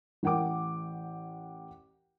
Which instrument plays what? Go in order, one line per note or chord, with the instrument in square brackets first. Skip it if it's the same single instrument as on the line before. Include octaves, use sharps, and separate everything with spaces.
[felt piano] A1 A#4 F#5 G5 D6